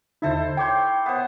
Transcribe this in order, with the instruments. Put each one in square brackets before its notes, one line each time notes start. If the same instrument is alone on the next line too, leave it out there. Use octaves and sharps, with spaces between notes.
[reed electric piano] D#2 D3 D#4 [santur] E4 A4 C5
[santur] C#5 C6 [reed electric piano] G5 D6 G6
[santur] B3 C5